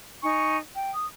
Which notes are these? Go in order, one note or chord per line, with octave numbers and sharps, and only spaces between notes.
D#4 G#5 C#6
G5
D#6